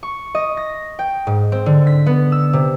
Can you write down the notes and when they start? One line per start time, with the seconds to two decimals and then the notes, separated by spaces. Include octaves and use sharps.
0.03 C#6
0.35 D#5
0.57 A#6
0.99 G5
1.27 G#2
1.52 C4
1.66 D3
1.87 B6
2.06 B3
2.32 E6
2.53 C3